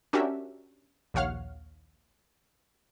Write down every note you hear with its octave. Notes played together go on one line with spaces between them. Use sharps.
C#4 D4 F#4 G4 A#4 E5
A#1 D#2 C#5 F5 F#5 F6